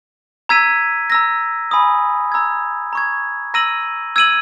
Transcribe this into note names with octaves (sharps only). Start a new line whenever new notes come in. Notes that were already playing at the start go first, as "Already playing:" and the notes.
A#5 E6 G#6 B6 D#7
A#5 E6 A#6
G#5 B5 D#6
A#5 E6 G#6
A#5 C#6 G#6
A#5 E6 A#6 D#7 F#7
E6 G#6 D#7 F#7